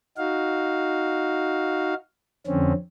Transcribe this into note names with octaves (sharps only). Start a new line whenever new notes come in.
D#4 F#4 F5
F2 D3 C4 C#4